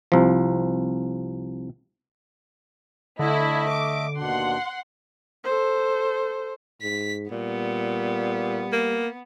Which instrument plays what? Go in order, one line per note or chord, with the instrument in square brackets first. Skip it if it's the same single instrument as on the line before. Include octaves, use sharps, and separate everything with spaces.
[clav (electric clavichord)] C2 F3
[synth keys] D3 [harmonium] A3 D#5 E5 [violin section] E4
[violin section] D6
[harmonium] D#2 B2 D4 [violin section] F#5 C6
[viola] A4 C5
[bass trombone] G#2 [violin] B6
[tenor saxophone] A#2 [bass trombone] G3 [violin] B3
[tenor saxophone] A#3